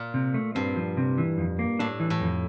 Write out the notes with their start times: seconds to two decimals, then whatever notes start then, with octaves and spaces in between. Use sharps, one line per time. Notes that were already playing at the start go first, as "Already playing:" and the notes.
Already playing: A#2
0.14 C3
0.34 A3
0.55 G2 C4
0.76 F3
0.97 C3
1.18 E3
1.38 F2
1.59 A#3
1.79 A2 D4
2.00 E3
2.10 A2
2.21 F2